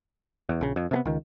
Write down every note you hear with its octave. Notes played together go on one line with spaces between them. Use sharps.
E2
A#1 C#3
F2
C3 A3 B3
C#2 D#3